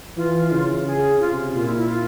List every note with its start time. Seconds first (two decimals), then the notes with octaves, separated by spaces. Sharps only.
0.17 E3 F4
0.52 C#3
0.85 G#4
1.20 C3 F4
1.55 A#2 F4
1.66 E4
1.78 E4
1.89 F4